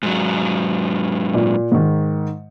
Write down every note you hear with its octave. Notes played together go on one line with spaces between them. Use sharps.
G#2 F#3
A#2
G#2 D#3